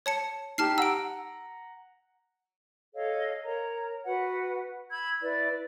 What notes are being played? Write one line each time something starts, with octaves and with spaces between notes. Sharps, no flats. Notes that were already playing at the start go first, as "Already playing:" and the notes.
C#5 A5 C#7
D#4 G4 G5 A5 F6 C7
F#5 A#5 E6 D7
A4 C#5 D#5 F5
A#4 C#5 A#5
F#4 B4 F#5
B5 E6 G#6
E4 B4 D5